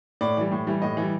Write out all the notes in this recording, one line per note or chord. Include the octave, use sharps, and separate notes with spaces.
A2 D5
E3 G3
A2
E3 G3
A2 D#5
E3
G3